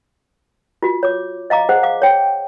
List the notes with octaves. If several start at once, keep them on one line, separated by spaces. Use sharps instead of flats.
F4 F#4
C#5 D6
D#5 F5 A#5 D6
G#4 C5 F#5
F5 D6
C#5 G5